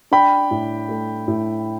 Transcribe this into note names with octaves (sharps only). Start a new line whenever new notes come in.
D4 G5 B5
A2
A3
A2